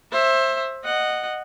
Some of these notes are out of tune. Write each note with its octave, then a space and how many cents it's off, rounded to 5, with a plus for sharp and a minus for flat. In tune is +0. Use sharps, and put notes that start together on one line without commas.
C5 +25 E5 +0
D#5 -15 F#5 +0